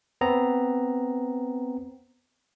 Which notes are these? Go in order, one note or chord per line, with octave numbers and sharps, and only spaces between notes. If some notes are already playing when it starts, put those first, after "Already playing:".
B3 C4 A#5